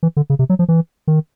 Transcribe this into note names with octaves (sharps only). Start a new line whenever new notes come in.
E3
D3
C#3
C3
F#3
F3
E3
D#3